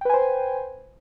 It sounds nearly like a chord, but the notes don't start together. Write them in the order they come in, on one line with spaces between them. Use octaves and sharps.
G5 B4 G#5 C5